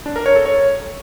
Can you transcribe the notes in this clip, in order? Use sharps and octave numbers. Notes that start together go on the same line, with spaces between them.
D4
A#4
C#5
A4
C#5